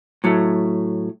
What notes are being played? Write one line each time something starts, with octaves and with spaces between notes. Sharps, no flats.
A2 F#3 A3